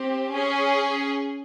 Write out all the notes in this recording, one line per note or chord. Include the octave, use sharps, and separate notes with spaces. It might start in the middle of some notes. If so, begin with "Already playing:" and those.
Already playing: C4 G4
C#4 G#4